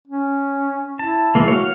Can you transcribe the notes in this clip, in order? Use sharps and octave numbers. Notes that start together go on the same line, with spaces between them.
C#4
E4 A5
E3 G#3 A#3
F#4 C#5 F5